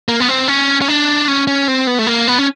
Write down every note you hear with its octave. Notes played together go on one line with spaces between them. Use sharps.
A#3
B3
C4
C#4
C#4
D4
C#4
C#4
C4
B3
A3
A#3
B3
C#4